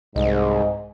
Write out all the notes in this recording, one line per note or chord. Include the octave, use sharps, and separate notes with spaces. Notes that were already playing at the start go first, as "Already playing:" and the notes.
C2 G#2 D#5